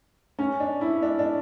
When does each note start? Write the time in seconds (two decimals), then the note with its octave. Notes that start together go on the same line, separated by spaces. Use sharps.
0.39 C#4
0.60 D4
0.81 E4
1.02 D4
1.19 D4